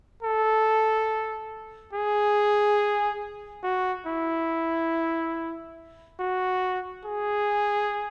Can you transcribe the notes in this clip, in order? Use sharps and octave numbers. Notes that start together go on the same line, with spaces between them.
A4
G#4
F#4
E4
F#4
G#4